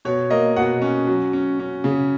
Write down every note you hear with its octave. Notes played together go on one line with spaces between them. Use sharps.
B2 C#5
A#3 D#5
B2 F#5
C#4
F#3
C#4
C#4
C#3